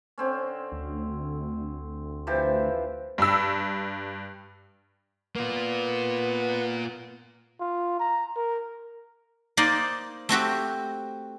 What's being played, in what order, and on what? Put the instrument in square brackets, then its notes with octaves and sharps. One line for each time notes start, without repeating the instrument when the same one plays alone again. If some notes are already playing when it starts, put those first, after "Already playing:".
[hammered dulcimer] D3 C4 C#4
[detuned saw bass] D2
[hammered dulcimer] E3 F3 G4
[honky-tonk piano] G2 E6
[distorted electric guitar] A#3 F4 [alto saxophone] B3
[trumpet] F4
A#5
A#4
[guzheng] A#3 D#4 C5 D5
A3 C4 F#4 G4